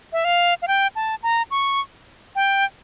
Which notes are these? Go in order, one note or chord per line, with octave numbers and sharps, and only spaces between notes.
E5
F5
F5
G5
A5
A#5
C#6
G5